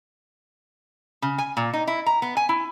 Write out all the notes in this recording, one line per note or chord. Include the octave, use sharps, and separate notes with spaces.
C#3
G#5
A#2
D#4
E4
A#5
B3
G#5
E4